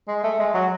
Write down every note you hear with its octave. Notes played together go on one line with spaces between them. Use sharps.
G#3
A3
G#3
F#3